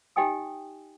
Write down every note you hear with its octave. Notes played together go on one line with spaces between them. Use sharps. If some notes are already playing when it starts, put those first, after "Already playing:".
D#4 G4 D#5 G5 G#5 D#6